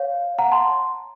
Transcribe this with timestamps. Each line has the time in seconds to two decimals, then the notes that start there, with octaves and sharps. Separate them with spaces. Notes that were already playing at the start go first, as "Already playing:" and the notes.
Already playing: C#5 F5
0.39 F#5 A#5
0.52 A5 C6